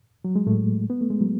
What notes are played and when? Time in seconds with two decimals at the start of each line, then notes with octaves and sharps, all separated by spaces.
0.25 F#3
0.36 G#3
0.47 A2 A3
0.90 B3
1.01 A3
1.10 G#3
1.21 F#3